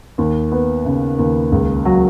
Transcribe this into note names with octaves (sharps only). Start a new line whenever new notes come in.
D#2
B3
C#3
D#2
C#2
F#3